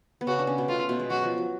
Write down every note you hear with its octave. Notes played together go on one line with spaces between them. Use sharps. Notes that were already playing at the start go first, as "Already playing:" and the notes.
B3
C#3 C#4 F#4
D4
C#3 C#4
B2 B3
A3 F4
A3
B2 B3
G#3
F#3 F#4
F3
F#3